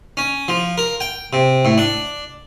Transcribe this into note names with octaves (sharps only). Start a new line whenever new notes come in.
C#4
F3
A#4
G5
C3
A2
D4